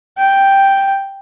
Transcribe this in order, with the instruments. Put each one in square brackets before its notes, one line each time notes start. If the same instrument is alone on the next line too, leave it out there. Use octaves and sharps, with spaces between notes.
[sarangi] G5